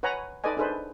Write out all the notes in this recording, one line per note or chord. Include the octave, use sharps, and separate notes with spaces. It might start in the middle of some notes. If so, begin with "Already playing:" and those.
B4 C#5 F#5 G#5 A#5
D#4 A4 B4 D5 D#5 G#5
D4 D#4 G#4 A4 B4 C5